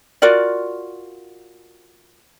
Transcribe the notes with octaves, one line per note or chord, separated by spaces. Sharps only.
F4 F#4 A#4 D5